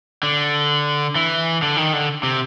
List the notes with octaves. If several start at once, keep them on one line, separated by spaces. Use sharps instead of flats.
D3
E3
D3
D#3
D3
C3